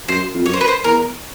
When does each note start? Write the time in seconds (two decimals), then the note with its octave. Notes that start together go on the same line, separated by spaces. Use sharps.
0.08 F#2 C5
0.34 F2
0.46 F#2 C#5
0.53 C5
0.61 B4
0.68 C5
0.84 E2 A#4